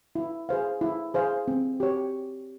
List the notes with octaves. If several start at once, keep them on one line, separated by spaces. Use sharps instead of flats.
E4
G#4 C5 F5
E4
G#4 C5 F5
C4
G4 C#5